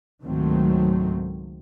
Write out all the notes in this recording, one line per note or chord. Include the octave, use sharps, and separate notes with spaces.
C#2 G#2 D#3 F#3 A3 C4